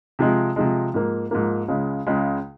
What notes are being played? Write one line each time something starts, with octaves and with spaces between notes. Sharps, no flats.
C3 F3 G#3
C3 F3 G#3
G#2 F3 A#3
G#2 F3 A#3
C#2 C#3 G#3
C#2 C#3 G#3